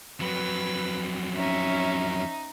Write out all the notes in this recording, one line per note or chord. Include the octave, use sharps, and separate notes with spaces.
F2 F#3 B4
C#4 D#4 E5